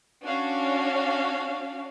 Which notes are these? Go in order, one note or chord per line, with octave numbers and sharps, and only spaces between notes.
C#4 D4 F#4 C#5 F5